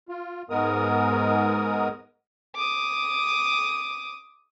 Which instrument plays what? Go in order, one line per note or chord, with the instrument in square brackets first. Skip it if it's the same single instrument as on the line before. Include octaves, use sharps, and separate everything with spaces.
[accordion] F4
G#2 G#3 B3 A#4 D#6
[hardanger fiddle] D6 D#6